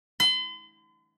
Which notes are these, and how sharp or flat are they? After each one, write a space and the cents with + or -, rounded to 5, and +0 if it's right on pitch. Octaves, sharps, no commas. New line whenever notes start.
C6 -45